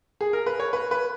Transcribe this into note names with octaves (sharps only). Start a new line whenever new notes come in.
G#4
A#4
B4
C#5
B4
B4